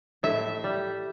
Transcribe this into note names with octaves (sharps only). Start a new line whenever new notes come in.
A2 E5
G3